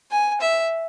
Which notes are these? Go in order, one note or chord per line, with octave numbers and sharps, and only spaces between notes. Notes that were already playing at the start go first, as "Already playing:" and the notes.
G#5
E5